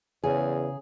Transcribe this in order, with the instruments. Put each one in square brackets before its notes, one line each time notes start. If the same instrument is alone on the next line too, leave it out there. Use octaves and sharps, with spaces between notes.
[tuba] E2 [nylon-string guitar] C#3 G#5 [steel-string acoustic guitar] G#4